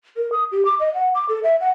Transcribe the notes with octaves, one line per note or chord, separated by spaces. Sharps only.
A#4
D#6
G4
D6
D#5
F#5
D6
A4
E5
F#5